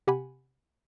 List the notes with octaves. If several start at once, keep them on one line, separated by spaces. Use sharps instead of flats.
C3 G4 F#5 G#5 B5